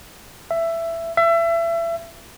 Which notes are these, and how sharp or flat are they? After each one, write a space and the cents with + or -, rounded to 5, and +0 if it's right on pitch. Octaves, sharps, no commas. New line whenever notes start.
E5 +15
E5 +30